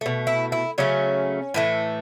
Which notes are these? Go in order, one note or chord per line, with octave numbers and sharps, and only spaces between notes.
B2 A3
E4
E4
C#3 F#3 A3 C#4
A2 E3 A3